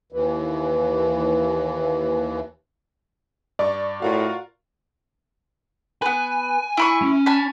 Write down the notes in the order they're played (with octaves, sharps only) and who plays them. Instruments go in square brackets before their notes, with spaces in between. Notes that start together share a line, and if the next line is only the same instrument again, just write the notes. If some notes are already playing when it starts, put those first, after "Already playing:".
[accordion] D#2 E3
[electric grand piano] G2 [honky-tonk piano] D5 C#6
[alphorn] A2 [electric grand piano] F4 A#4 F5 [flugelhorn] F#4
[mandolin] B3 B4 [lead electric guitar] G#5
[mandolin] E4 B5 C#6
[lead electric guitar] C#4
[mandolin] G#5 A5 B5